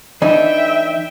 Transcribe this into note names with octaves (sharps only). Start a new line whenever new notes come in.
E3 D4 D#4 E5 G5